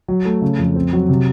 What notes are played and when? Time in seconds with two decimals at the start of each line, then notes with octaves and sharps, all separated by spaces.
0.08 F#3
0.25 A3
0.42 C#3
0.59 F2
0.76 C4
0.93 F#3
1.09 C3